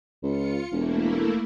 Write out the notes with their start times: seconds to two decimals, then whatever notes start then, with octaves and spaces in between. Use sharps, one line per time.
0.23 C#2 F4 C#7
0.72 E1 A3 A#3 E4